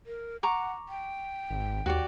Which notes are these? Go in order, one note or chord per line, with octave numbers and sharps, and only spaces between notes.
A#4
F#5 A#5 C#6 D6
G5
G#1
D#2 F#4 G4 D5